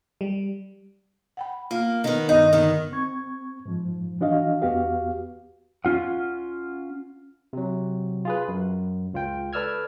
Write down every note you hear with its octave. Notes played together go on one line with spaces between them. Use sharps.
G3
F#5 G5 B5
A#3 F4
D#3 B3
G2 D#3 D#4
D3 D#3 B3 D#4
C4 C#6 G#6
G#2 F3
E3 D4 F#4 D#5 F5
E2 B3 F#4 G4 F5
C#4 F4 F#5
C3 F#3
F4 G#4 B4
F#2
C#2 F4 G5
A4 B4 D5 E6 F6 G#6